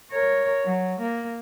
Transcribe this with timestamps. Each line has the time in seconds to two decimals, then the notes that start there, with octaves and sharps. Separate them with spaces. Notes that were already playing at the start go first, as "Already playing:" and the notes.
0.12 A#4 C#5
0.65 F#3
1.01 A#3